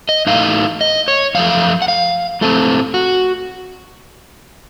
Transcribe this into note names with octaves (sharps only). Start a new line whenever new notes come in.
D#5
A2 A3 D#4 F5
D#5
C#5
F#2 F3 A3 F5
F#5
F5
A2 A3 C4 A4
F#4